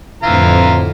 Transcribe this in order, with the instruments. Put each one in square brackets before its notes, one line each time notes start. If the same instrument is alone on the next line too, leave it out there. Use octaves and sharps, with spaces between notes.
[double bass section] F2 A2 D3 [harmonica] E3 F4 A#5